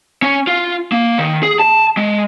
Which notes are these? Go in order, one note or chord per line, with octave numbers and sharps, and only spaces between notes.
C#4
F4
A#3
D#3
G#4
A5
G#3